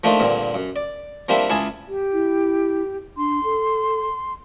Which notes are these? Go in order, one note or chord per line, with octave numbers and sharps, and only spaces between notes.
F3 A3 A#3 D4 D#4 F4
G2 A#2 D3 C4
F#2
D5
F3 G3 A#3 C4 D4 E5
C#2 E4 F5 G#5 A5 D#6
G4
E4
D4 C6
A4